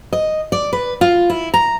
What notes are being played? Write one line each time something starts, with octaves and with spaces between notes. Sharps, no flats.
D#5
D5
B4
F4
E4
A#5